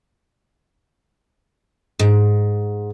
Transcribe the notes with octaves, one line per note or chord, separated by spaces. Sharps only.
G#2